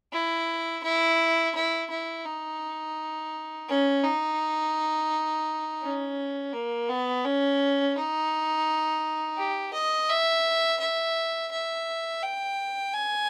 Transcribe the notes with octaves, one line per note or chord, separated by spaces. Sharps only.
E4
E4
E4
E4
D#4
C#4
D#4
C#4
A#3
B3
C#4
D#4
G4
D#5
E5
E5
E5
G5
G#5